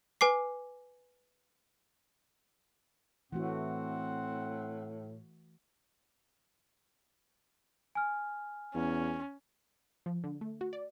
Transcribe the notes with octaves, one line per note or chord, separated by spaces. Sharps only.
B4 G#5 D6 C7
A2 E3 A3 C4 F#4 F#5
G#5 F6
E2 C#4
F3
D3
A3
F#4
D5